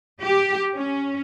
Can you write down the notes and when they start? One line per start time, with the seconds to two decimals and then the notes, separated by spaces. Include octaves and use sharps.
0.22 G4
0.74 C#4